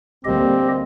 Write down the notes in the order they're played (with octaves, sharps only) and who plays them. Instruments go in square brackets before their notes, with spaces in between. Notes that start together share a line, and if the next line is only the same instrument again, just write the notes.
[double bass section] D2 G3 A#3 [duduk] C4 [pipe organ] G4 D#5